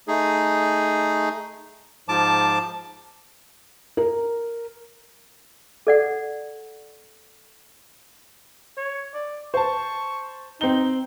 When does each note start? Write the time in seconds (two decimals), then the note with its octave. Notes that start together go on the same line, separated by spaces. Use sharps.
0.08 A3 D#4 G#4
2.08 G#2 F3 A5 D6
3.97 A#4
5.87 A4 D5 F#5
8.77 C#5
9.14 D5
9.54 C5 A5 C#6
10.61 C4 D#4 G7